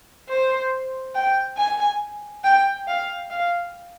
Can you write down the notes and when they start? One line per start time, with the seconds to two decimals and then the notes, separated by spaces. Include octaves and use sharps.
0.29 C5
1.15 G5
1.58 G#5
2.44 G5
2.88 F5
3.30 F5